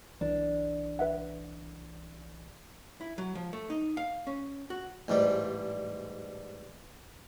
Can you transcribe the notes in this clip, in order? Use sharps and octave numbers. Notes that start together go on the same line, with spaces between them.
B1 E3 D4
B4 E5 F#5
E4
F#3
F3
A3
D#4
F5
C#4
F#4
A1 G#2 G3